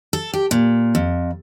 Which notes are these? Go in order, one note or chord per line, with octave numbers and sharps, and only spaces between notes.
A4
G4
A#2
F2